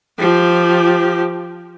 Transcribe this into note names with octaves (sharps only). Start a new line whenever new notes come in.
F3 G4